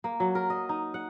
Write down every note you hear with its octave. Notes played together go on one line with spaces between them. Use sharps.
A#3
F#3
A#4
D#5
D#4
F#5